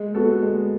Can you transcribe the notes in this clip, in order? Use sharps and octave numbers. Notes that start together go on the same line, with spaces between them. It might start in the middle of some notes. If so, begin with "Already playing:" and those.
Already playing: G#3
B3 F#4 A4
G#3